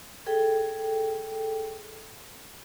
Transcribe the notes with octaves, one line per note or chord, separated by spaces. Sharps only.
G#4 A4 G5